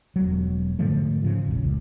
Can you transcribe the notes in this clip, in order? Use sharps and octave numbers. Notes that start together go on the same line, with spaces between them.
E1 F#3
G#2 D3 F3 A3
C#3 F3
F1 A#1
C#2